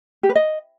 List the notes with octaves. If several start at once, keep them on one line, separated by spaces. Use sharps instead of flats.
G4
B4
D#5